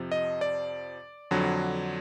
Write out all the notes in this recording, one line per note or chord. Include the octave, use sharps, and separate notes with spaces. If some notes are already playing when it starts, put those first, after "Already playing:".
Already playing: F2 C3 F3
D#5
D5
F2 D3 F#3